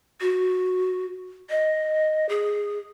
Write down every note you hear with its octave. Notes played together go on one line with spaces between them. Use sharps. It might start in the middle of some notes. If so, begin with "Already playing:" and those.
F#4
D#5
G#4